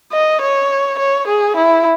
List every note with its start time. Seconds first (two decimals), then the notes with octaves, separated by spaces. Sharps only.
0.12 D#5
0.41 C#5
0.99 C#5
1.27 G#4
1.56 E4